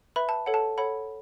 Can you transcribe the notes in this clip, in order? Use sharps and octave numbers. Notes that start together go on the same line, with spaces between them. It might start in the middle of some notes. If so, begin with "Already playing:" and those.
B4 E5 B5
A5
A4 C#5 F#5
A5
A4 C#5 F#5 B5